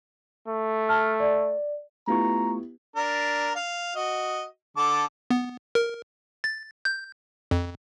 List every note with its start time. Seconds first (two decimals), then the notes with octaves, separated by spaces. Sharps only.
0.48 A3
0.89 A5 F6
1.20 D5
2.08 A3 B3 E4 F4 G4 A#5 C#6
2.96 D4 A#4
3.55 F5
3.96 F#4 D#5
4.77 D3 A4 D6
5.30 B3
5.75 A#4
6.44 A6
6.85 G6
7.51 F2